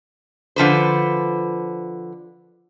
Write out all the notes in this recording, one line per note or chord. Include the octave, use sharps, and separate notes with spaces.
D3 F3 B4 C5